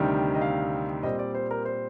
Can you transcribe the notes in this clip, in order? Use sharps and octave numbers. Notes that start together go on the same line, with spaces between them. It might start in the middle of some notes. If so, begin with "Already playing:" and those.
Already playing: D2 C3 D#3 G3
D#5
F5
A#2 G3 C4 D#5
D5
C5
A#4
C5